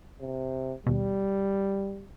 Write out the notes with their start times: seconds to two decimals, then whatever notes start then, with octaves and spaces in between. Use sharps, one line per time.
0.20 C3
0.87 D#2 B2 G3